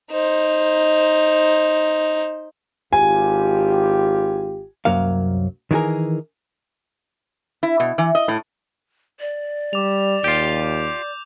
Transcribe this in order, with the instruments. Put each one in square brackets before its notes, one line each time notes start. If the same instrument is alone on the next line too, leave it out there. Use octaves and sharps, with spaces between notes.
[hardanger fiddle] D#4 C5
[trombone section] G#1 F4 G4 [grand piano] G#5
[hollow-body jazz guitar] C2 F#2 F#3 A#3 F5
D#3 E3 F4 G#4 A#4
[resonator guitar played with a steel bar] E4
B2
E3
D#5
A2
[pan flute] D5
[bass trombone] G3 [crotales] D6 F7
[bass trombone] D#2 [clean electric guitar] F4 G4 [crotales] G6